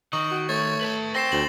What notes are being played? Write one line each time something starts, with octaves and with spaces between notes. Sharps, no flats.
D#3 D#5 C#6
F#4
A3 C#5 A6
B4 A5
C4 C6 A#6 C7 E7
D2 F#7